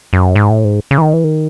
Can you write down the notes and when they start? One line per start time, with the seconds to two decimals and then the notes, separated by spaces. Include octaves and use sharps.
0.13 F#2
0.36 G#2
0.50 A2
0.65 G#2
0.91 C#3
0.98 E3
1.02 D#3
1.13 E3
1.24 D#3